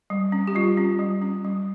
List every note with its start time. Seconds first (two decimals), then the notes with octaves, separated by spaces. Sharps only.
0.10 G3
0.32 C#4
0.47 G4
0.55 G3 F4
0.78 C#4
0.99 G3
1.22 C#4
1.44 G3